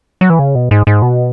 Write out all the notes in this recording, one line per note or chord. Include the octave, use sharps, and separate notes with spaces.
F#3
E3
C#3
B2
G#2
G#2
B2